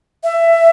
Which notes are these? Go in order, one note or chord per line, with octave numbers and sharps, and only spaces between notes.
E5